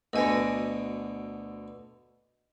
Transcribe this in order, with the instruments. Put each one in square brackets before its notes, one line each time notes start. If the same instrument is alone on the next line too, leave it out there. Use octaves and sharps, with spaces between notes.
[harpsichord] D2 B2 D3 [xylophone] D#5 G#5 A#6